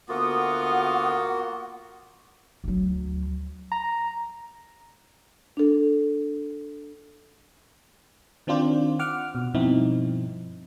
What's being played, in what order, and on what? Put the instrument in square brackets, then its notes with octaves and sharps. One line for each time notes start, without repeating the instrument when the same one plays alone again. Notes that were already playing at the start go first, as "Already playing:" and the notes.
[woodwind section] D2 B3 D#6 [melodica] A#3 F#4 [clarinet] F4 [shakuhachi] F#5
[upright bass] D2 F#3
[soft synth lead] A#5
[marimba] D4 A4
[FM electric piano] D#3 C4 D4 F4 C5 D5
F#5 D6 F6
B2
G2 B2 F3 C4 D#4 E4